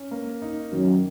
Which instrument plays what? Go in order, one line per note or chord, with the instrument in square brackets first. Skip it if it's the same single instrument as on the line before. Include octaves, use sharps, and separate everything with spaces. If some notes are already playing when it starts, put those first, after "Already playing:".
Already playing: [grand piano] C#4
A#3
D#4
[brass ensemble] F#2 [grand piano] D#3